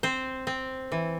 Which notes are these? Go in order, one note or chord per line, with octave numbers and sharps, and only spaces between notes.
C4 C5
C4
E3